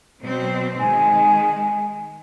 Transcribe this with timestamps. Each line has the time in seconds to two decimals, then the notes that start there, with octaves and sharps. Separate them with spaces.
0.23 B2 F#3 C4
0.80 D#3 G#3 G#5